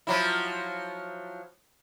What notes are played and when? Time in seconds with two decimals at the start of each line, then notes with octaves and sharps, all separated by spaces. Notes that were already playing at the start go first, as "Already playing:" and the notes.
0.07 F3 F#3 E4